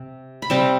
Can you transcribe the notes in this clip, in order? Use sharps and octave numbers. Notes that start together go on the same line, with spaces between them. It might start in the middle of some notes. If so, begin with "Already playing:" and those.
Already playing: C3
B5
C3 G3 C4 A5